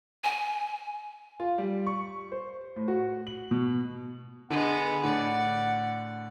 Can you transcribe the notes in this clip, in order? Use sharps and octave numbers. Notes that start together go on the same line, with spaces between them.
G#5
F4
G3
C#6
C5
A2
F#4
F#7
B2
D3 G#3 B3 F#5
A2 D3 D5 F#5